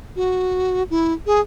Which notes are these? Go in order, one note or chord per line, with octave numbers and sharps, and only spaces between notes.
F#4
E4
G#4